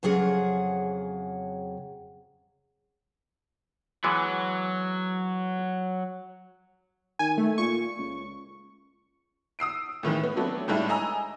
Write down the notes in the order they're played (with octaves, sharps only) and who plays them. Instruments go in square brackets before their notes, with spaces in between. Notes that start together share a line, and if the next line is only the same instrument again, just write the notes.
[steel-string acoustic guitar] F2 C#3 F#3 G#4 F#5
[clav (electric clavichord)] E3 G#3 B3 [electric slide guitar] F#3
[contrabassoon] D#3 [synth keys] G#5
[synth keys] A3
[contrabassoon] A#2 [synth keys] C#6
[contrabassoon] C#2
[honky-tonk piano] D#6 E6 C7 D7
A2 D#3 E3 G#3
B3
F#3 A3 B3 C4 D4
A2 G3 G#3 D4 E4
D#5 G#5 A#5 E6